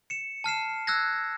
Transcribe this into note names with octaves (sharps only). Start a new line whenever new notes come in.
C#7 E7
A5 F6 C7 E7
E6 F#6 G#6 A#6